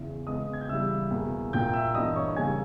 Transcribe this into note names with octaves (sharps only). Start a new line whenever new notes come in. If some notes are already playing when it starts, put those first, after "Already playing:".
Already playing: E2 C#3 E3 E5
C#3 G#3 B3 D#5 D#6
G#6
G6
C#3 E3 G3 E5 E6
E2 B2 A#3
A#2 A#3 G5 G6
E5 E6
G2 E3 A#3 D#5 D#6
C#5 C#6
C#3 G3 A#3 G#5 G#6